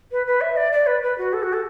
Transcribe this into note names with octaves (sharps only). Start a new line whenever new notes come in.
B4
B4
E5
D5
D5
B4
B4
F#4
A4
F#4
A4